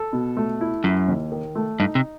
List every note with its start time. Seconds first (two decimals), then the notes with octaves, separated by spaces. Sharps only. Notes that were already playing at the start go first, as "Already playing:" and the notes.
Already playing: A4
0.13 B2
0.37 A3
0.61 E4
0.84 F#2 E4
1.08 D#2
1.32 D#3
1.55 A3
1.79 G2 D#4
1.95 C3